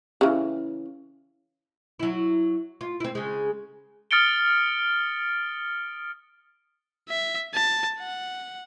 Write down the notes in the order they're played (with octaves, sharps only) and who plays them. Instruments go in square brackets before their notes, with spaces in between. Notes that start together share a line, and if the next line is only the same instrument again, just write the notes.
[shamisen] C#3 E3
[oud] F#3 E4
F4
C4 E4
C#3 G#3
[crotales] D#6 F6 A6 C#7 D7 G7
[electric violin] E5
A5
F#5